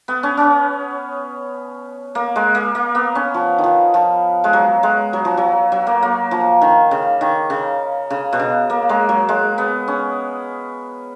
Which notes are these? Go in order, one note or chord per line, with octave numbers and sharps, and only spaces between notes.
B3
C#4
C#4
A#3
G#3
A#3
A#3
B3
C#4
F3
D#3
F3
F3
G#3
F#3
G#3
F#3
F3
F#3
F#3
A#3
A#3
F3
D#3
C#3
D#3
C#3
C#3
B2
C#3
A#3
G#3
F#3
G#3
B3
C#4